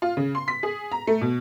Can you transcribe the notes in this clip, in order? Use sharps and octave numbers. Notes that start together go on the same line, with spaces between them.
F4
C#3
C6
B6
G#4
A#5
A3
B2